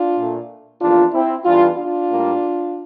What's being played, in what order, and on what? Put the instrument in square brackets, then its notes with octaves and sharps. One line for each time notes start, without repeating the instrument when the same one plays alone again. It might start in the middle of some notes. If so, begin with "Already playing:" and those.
Already playing: [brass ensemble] D4 F4
A#2 A3
E2 C3 F3 A#3 D4 F4
C4 E4
E2 E3 G3 D4 F4
D4 F4
A2 G3 A#3